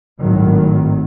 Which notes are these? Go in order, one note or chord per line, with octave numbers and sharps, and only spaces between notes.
G#1 A2 D#3 F#3